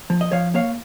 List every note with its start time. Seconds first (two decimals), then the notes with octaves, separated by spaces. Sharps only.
0.10 F3
0.21 D#5
0.32 F3 C#5 F5
0.54 A#3 C#5 F5